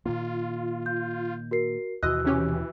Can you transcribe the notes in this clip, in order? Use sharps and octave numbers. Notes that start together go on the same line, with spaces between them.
A#2 D#3 A#3 F4
G6
F#4 A#4 C7
D#2 B2 E3 F#4 D#5 E6 F#6
C3 C#4 G4